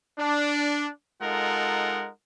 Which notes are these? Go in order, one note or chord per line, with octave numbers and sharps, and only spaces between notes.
D4
G#3 D#4 F4 A4 A#4 F#5